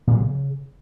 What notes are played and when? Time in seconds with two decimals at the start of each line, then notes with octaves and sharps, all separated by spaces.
0.07 A#2
0.14 F#3
0.21 C#3